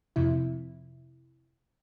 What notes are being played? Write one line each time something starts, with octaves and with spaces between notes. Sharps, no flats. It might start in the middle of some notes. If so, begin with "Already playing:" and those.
F2 C3 E4